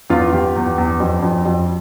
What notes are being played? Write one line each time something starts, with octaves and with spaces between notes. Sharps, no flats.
E2 F4
E2 G4
E2
E2
F2
F2
F2